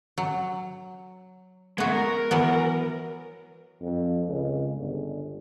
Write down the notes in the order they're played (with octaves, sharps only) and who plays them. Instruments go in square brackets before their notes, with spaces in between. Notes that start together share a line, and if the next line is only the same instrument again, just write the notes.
[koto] F#3
[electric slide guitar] G#3 A3 [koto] B3 F#4
[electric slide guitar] A#4
[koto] E3 F#3 B3
[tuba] F2
C#2
G1